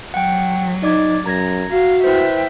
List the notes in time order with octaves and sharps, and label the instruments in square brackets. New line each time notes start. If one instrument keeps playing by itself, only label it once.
[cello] F#3 [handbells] F#5 G5
[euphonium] D#4 [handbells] D5 D6 G#6
[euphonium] F#2 [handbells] A#5 G#6 A#6
[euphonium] F#4 [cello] F5
[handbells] E4 B4 C5 [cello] E5 G5